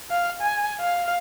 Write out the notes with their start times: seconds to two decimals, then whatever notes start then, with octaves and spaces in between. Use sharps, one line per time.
0.11 F5
0.41 G#5
0.80 F5